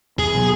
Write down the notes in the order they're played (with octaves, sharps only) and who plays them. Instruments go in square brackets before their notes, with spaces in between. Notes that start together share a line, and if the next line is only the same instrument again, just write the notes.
[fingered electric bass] E2 [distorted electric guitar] G#4
[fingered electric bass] B2 F#3